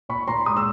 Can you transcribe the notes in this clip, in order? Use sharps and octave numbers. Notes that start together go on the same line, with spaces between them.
A#2 B5 C#6
A#2 A#5 C6
G#3 D#6
E6